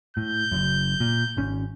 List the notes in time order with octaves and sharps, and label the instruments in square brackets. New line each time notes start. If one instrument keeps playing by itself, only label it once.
[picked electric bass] A2 [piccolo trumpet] G6
[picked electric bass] F#1 F#2
A#2
G#1 C#4